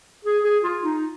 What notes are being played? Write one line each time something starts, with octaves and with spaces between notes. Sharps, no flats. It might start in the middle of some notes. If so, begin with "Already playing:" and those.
G#4
G#4
F4
D#4